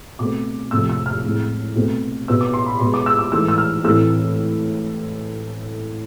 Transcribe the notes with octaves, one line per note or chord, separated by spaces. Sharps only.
B2 A3 C4 D6
F2 C3 F3 A3 E6
E6
F6
A2 G#3 C4
B2 A3 C4
B2 B3 E6
D6
C6
B5
B2 G#3 B3 C6
D6
E6
D6
G#2 E3 A3 E6
E6
F6
A2 E3 A3 C4 E6